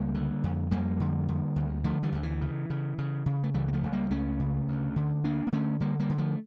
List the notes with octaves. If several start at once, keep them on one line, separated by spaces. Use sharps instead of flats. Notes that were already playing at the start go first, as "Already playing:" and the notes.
Already playing: C#2 G3 A#3
D3
F2
F2 G3 A#3
D3
D3
D2
D3 F3 A3
E3 G3
D2 D3
E3
C#3
C#3
C#3
C#3
A3
C#2 E3 G3
A#3
F3 A3
C#2
G3 A#3
C#2 A3 C#4
C#3
D2
D3
D2 A#3 D4
A#3
D3 A3 C#4
D3 G3 A#3
G3 A#3
D3
F3 A3